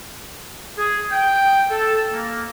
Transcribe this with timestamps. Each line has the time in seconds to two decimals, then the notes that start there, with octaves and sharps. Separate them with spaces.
0.77 G#4
1.11 G5
1.71 A4
2.12 A#3